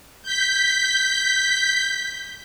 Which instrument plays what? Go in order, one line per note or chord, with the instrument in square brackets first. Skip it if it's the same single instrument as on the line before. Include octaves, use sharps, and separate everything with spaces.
[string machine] G6 B6